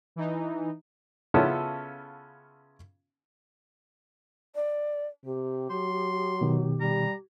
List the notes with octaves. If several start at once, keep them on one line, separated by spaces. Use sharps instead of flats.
E3 D#4
C#3 B3 C#4 E4 F4 A4
D5
C3 G4
F#3 C6
B2 D#3
G3 A#5